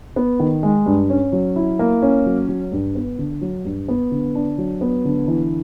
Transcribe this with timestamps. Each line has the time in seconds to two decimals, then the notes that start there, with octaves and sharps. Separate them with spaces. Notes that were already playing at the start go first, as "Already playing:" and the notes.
0.16 B3
0.40 D#3
0.63 G#3
0.86 G2
1.10 C#4
1.32 F#3
1.56 E4
1.79 A#3
2.02 C#4
2.26 F#3
2.49 F#3
2.72 G2
2.95 B3
3.18 D3
3.42 F#3
3.65 G2
3.89 B3
4.11 D3
4.35 D4
4.58 F#3
4.81 B3
5.05 D3
5.28 E3